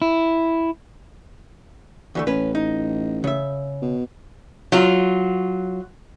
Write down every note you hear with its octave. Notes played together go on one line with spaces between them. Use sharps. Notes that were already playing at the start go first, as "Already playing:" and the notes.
E4
D2 E3 A3
A1 C#4 B4
D#4
C#3 E5
B2
F#3 F4